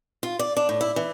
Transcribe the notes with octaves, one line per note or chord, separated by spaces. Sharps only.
F4
D5
D4
A2
E4
E3